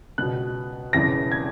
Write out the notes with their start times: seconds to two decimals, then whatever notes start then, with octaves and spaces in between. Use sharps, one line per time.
0.18 C#2 B2 F#6
0.93 E1 E2 C#3 E3 A#6
1.32 G#6